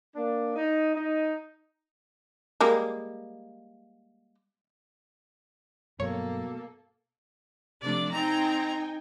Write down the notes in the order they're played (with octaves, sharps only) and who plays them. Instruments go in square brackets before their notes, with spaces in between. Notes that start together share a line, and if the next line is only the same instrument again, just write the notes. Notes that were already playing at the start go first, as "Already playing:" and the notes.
[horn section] A#3 D4
D#4
D#4
[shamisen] G3 G#3 A#3
[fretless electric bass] G2 F#3 [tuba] B2 [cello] A#3 A4 [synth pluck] C#5
[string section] C3 F3 A3 [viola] D4 D5
[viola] C4 A#5 [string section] D#4 G5 G#5